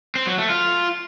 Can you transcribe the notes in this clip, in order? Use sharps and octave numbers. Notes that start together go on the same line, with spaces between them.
C4
F#3
A3
F4